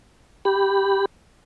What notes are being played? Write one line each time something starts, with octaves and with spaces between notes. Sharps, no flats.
G4 B5